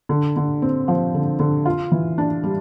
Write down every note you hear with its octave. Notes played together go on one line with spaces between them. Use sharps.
D3
D3
C4
F3
D3
D3
F4
E3
D4
G3